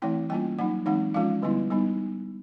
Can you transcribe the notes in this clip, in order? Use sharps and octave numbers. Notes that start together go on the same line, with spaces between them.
E3 A3 C4 E4 G5
G3 A#3 C#4 F4 G5
F#3 A#3 D#4 F#5
E3 G#3 C4 D#4 F#5
F3 G#3 C#4 F4 F5
D3 G3 B3 E4
G3 B3 D#4